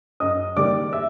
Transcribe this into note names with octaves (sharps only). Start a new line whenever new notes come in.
F#2 D#5 D#6
D#3 G3 A#3 D5 D6
E5 E6